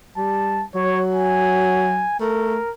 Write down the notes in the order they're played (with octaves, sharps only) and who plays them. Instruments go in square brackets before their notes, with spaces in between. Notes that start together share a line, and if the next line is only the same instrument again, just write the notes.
[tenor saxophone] G3 [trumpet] A5
[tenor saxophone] F#3 [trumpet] C#5
[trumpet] G#5
[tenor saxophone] A3 [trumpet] A#4